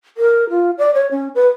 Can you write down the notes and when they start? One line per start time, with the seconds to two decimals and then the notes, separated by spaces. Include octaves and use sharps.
0.17 A#4
0.50 F4
0.78 D5
0.94 C#5
1.11 C#4
1.35 B4